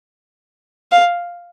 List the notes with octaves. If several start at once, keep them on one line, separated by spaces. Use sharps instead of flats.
F5